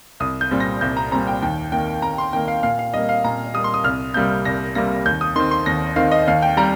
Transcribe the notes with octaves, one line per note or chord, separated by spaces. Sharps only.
C2 D#6
G6
A#2 G3 C4
A#6
C2 G6
A#5
A#2 G3 C4 A#5
G5
D#2 G5
D#3 A#3 G5
D#2 A#5
C6
D#3 A#3 G5
F5
A#2 F5
F5
G3 A#3 D#5
F5
A#2 A#5
G3 A#3 D#6
C6
D#6
C2 F6
C3 G3 A#3 G6
C2 A#6
C3 G3 A#3 A#6
D#2 G6
D#6
D#3 C4 C6
C6
D#2 A#6
D#3 C4 F5
D#5
D#2 F5
G5
G3 A#5